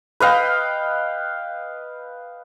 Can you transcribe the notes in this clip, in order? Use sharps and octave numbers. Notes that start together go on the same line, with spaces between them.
B4 D#5 F5 G5